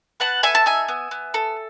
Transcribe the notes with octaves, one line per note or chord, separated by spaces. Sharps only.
B3 F#5 A5
A4 E5 G#5
A5
D#4 E5 G#5
B3
B3
A4